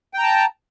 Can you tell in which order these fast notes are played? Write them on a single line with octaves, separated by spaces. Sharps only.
G5 A#5 A5